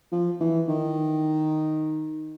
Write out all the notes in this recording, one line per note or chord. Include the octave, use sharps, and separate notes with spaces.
F3
E3
D#3